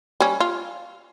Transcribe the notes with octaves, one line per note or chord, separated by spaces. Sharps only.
G3 C#4
F4